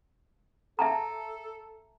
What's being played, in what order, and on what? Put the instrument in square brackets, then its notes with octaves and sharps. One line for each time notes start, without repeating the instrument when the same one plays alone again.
[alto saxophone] A4 [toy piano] E5 A5 A#5